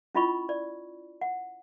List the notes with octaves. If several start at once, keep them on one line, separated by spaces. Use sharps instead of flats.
C#4 E4 F4 D#5 B5 C#6
D5
F#5